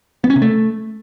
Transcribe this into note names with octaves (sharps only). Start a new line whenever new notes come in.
B3
C#4
C3
A3